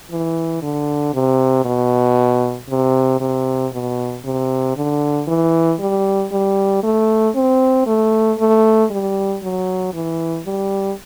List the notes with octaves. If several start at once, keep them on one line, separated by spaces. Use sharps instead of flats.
E3
D3
C3
B2
C3
C3
B2
C3
D3
E3
G3
G3
A3
C4
A3
A3
G3
F#3
E3
G3